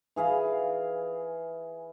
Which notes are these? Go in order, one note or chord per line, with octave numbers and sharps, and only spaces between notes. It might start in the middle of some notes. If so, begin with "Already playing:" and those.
E3 G#4 F5 B5